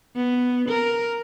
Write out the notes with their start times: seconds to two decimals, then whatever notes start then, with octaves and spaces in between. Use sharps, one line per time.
0.16 B3
0.69 A#4